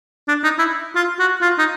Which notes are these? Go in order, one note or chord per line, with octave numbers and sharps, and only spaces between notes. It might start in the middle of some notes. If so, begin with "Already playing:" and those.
D4
D#4
E4
F4
F#4
F4
D#4